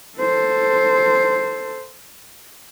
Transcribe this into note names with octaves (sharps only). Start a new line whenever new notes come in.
A4 C5